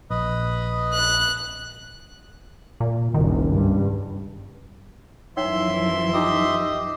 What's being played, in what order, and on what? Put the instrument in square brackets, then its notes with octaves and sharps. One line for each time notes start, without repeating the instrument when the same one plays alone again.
[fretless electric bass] A#1 [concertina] B4 D#5
[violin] F#6
[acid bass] A#2
[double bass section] F#1 C2 [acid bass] D#3
[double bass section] C#2 G2
[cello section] F#2 E3 F3 [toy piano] D#4 C#5 G5 [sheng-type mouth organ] E5 C6
[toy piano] D#4 F4 [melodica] G4 D#5